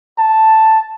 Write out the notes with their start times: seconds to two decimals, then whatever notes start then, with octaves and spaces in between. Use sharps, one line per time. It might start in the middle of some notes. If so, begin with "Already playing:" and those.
0.19 A5